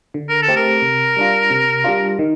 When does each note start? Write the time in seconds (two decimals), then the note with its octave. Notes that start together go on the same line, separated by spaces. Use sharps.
0.14 D3
0.29 A#4
0.42 A4
0.48 A3 C4 G4
0.56 A#4
0.82 C3
1.17 G3 D4 F4
1.50 C3
1.84 G3 D4 F4
2.19 D#3